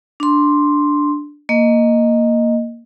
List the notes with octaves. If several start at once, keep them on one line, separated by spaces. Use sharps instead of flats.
D4 C6
A#3 D#5